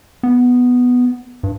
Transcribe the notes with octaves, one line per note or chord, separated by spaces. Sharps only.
B3
G2